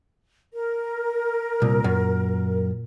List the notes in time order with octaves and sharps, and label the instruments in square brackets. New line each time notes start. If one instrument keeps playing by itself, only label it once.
[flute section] A#4
[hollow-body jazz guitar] C2 [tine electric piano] A#2
[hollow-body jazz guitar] F#2